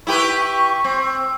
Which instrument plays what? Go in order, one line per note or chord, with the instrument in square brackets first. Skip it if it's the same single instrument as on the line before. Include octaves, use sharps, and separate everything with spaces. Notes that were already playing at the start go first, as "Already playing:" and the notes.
[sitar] E4 G4 B4 [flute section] C#6
[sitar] C4